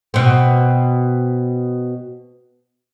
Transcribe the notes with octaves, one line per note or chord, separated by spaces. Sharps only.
B2 C4